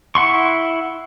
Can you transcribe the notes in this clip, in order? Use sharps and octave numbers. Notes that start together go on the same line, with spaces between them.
E4 F#5 C6 C#6